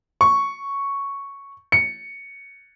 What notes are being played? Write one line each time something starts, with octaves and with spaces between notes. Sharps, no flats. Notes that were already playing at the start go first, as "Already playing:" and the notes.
C#6
C#7